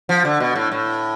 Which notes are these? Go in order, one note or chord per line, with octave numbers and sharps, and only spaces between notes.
F3
D3
B2
A2
A2